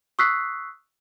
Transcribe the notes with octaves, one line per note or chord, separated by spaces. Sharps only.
C#6 D#6 E6 F#6 B6 C7